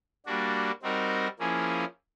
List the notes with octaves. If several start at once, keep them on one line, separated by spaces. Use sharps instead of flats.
G3 A#3 D4 F#4
G3 C4 D#4 F#4 A#4
F3 A#3 C#4 E4 G#4